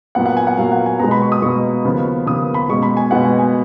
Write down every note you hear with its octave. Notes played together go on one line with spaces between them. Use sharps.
A#2 F#3 B3 F#5
F#5
G#5
F#5
A#2 F#3 B3 F5
F#5
G#5
B2 G#3 B3 A#5
B5
C#6
D#6
B2 G#3 B3 C#6
D#2 C#3 F3 B3
D#2 C#3 F3 B3 D#6
B5
B2 G#3 B3 C#6
B5
G#5
B2 G#3 B3 F#5
G#5
G#5